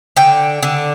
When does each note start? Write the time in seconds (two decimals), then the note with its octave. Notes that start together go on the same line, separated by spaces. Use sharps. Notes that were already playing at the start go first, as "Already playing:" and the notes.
0.17 D3 G5
0.63 D3